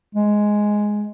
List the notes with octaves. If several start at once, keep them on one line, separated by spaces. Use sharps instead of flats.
G#3